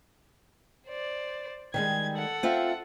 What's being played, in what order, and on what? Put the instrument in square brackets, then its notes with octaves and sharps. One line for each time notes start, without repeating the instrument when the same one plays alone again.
[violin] C5 D5
[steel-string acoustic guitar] D#3 G3 G#3 [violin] G#6
[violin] A4 F#5
[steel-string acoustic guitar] C4 F4 E5